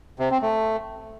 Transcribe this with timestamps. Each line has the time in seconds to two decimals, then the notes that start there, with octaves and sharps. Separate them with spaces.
0.19 C3
0.31 C4
0.42 A3